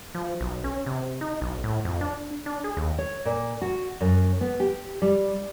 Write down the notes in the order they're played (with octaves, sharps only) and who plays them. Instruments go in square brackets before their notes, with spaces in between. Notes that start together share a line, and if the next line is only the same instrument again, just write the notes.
[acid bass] F3
B1
C#4
C3
D#4
B1
A2
F2
D4
D4
G#4
D#2
[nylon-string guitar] C#5
A#2
F#4
F#2
B3
G4
G3